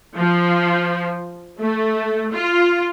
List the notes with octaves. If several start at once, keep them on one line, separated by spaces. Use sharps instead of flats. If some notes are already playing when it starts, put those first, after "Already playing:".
F3
A3
F4